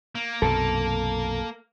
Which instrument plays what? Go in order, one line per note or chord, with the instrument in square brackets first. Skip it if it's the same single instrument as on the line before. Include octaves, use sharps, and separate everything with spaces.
[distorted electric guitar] A#3
[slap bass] B1 F#2 C3 [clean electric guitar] A4